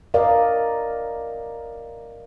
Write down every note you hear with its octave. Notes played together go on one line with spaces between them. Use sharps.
A#4 D5 D#5 F5